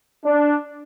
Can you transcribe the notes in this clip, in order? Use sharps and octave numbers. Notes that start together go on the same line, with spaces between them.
D4